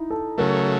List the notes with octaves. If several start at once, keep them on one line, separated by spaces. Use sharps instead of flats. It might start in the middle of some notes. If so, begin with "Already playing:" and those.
Already playing: D#4 E4
A4
C#3 F#3 A3 A#4